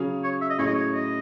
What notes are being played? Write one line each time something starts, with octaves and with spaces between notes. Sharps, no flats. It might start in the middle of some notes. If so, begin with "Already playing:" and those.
Already playing: C#3 F#3 C#4 G#4
C#5
E5
D#5
A2 F#3 C#4 G#4 C#5
D#5
C#5
D#5